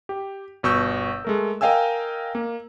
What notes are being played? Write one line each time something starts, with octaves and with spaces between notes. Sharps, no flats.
G4
G1 B2 C#6 E6 G6
G#3 A3 A#4
A#4 D#5 F5 G5 G#5 E6
A#3